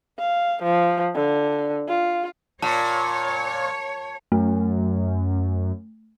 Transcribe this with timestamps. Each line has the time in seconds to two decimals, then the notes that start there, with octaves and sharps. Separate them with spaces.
0.19 F5
0.63 F3
1.15 D3
1.88 F4
2.62 A#2 C#5 A5
4.32 F#2 A3